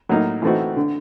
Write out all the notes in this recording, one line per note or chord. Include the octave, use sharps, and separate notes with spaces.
A2 F#3 A#3 D#4
E3 A3 C4 D#4 F#4
D3